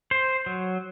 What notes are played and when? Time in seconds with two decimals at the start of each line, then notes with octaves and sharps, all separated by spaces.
0.11 C5
0.46 F#3